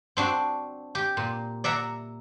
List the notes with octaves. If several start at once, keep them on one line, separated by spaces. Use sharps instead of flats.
C4 D4 F#4
G4
A#2
D5 E5 F#5 A#5